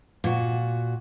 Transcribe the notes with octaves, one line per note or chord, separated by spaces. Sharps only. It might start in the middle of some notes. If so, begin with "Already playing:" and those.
A#2 F#4